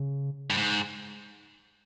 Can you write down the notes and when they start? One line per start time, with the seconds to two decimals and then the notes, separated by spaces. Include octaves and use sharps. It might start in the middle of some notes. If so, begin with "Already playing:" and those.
Already playing: C#3
0.50 G2
0.57 G#2